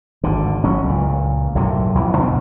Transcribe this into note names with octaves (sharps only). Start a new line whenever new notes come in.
G#1 D3
A1 F#3 C#4
C#2 A#2
B1 F#2 A2 C3
A#1 E2 B2 E3
B2 D3 C4